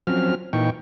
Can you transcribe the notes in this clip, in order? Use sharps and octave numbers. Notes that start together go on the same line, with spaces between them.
F3 F#3 C4 C#4 F6
A#2 E3 D#4 G5 C#6